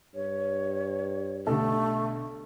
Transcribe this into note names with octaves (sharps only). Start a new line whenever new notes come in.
G2 C#5
B1 D3 A3 G4 A4